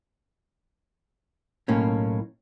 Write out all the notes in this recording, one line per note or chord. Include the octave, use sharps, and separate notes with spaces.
B1 A2 A#3 C#4